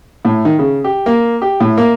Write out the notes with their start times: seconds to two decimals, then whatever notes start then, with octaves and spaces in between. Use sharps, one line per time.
0.25 A2
0.45 D#3
0.59 C#3
0.84 G4
1.06 A#3
1.42 G4
1.60 A2
1.77 A#3